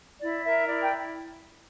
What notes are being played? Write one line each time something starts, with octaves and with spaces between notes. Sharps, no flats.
E4 D5
A#4 E5
E4 D5
G5